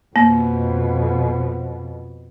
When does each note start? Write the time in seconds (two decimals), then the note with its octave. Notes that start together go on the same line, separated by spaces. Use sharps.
0.16 F2 B2 A#3